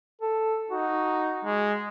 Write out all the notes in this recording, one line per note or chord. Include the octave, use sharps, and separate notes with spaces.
A4
D#4 F#4
G#3